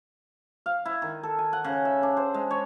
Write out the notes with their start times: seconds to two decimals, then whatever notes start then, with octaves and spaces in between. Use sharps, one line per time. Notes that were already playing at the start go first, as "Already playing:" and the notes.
0.66 F5
0.86 E4
1.02 D#3
1.23 A4
1.38 G#5
1.53 F#5
1.64 C#3
1.85 E5
2.03 D4
2.17 C5
2.34 G#3
2.51 C#5